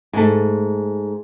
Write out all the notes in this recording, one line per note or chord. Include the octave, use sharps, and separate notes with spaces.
G#2 A3